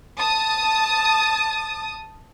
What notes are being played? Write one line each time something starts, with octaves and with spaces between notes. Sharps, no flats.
A5 D#6